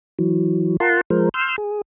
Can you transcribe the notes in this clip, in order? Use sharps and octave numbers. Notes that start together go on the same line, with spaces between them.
E3 F#3
F4 A#4 F#5 A5 C6
F3 G#3 A#4 C5
C6 E6 F6 G6
G#4